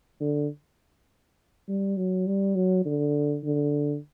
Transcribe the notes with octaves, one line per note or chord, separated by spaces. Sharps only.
D3
G3
F#3
G3
F#3
D3
D3